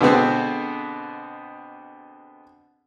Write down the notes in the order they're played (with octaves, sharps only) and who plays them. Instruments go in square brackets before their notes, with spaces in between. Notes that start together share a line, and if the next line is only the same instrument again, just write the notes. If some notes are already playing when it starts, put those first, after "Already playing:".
[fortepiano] B2 D3 G#3 B3 C4